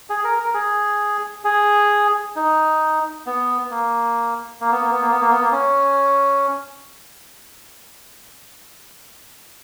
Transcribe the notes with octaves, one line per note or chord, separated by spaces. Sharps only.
G#4
A#4
A#4
G#4
G#4
D#4
B3
A#3
A#3
B3
A#3
B3
A#3
B3
A#3
B3
A#3
C#4